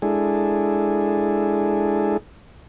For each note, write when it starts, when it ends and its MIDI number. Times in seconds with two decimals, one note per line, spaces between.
0.02 2.17 56
0.02 2.17 62
0.02 2.17 64
0.02 2.17 68
0.02 2.17 69